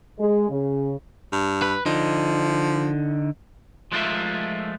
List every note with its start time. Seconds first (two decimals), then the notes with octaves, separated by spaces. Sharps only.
0.19 G#3
0.49 C#3
1.33 G2
1.62 B4
1.86 D3 F3 D#4
3.92 F3 G#3 A3 F4 A#4 E5